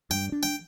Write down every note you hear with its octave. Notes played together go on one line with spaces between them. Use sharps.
G2 G5
D4
G5